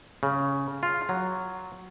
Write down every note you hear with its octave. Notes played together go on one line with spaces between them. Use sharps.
C#3
F4
F#3